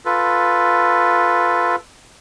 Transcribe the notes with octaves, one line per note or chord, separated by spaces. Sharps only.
F4 A4 B4